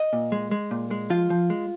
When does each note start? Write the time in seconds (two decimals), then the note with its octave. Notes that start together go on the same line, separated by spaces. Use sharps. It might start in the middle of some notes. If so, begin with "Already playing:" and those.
Already playing: D#5
0.13 A#2
0.32 G#3
0.51 G#3
0.71 A#2
0.91 G#3
1.10 F3 F4
1.30 F3
1.50 G#3